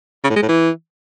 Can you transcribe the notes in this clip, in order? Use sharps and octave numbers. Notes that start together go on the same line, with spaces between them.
C#3
A2
G#3
A2
E3